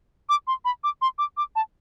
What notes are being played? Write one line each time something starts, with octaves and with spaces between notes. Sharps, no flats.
D6
C6
B5
D6
C6
D6
D6
A5